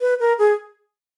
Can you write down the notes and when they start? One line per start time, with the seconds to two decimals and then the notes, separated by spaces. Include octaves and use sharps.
0.01 B4
0.20 A#4
0.39 G#4